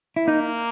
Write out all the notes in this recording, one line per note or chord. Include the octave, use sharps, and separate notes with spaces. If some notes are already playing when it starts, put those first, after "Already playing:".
E4
A#3 D#4